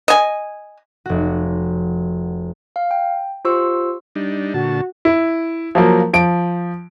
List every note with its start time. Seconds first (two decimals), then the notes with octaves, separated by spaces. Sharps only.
0.08 D#5 G#5
1.06 F1 F#4
2.76 F5
2.91 G5
3.45 F4 G4 C5 C6 C#6 E6
4.15 G3 D4 D#4
4.54 A#2 D3 F#4 A5
5.05 E4
5.75 F3 F#3 A#3
6.13 F3 D7